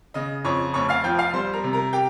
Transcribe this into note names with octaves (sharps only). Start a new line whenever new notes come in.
C#3 D#5 D#6
F2 C#5 C#6
F1 C#5 C#6
F5 F6
F3 G5 G6
F5 F6
G3 C5 C6
A#4 A#5
C3
A#4 A#5
G4 G5